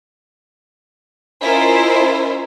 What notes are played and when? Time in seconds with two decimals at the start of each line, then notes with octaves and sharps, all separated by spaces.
1.41 C#4 E4 F4 A#4 C5 D#5